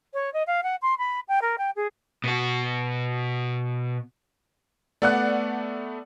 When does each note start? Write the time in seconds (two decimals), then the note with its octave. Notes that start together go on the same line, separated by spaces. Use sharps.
0.14 C#5
0.33 D#5
0.47 F5
0.63 F#5
0.82 C6
0.98 B5
1.28 G5
1.42 A#4
1.58 G5
1.76 G#4
2.24 B2 F#4
5.02 A3 B3 D5 F#5 F#6